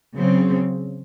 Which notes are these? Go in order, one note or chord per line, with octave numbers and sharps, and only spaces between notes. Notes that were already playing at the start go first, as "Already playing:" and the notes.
C#3 F#3 C4